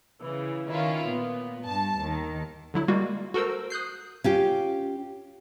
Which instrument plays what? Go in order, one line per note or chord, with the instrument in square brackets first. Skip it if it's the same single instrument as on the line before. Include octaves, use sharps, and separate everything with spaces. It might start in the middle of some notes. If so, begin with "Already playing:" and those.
[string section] C#3 E3
D#3 C#4 E4 F4
A#2 B3
G2 A5
D#2 D#3
[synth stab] D3 F#3 E4
G3 G#3 A#3 F4 F#4
F#4 A4 A#4 C5 E6
D#6 F#6 G6 C7
[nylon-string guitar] C#4 F4 G4